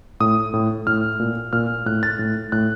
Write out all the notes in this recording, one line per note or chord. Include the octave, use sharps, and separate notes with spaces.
A2 D#6
A2
A2 F6
A#2
A#2 F6
A2 F#6
A6
A2
A2 F#6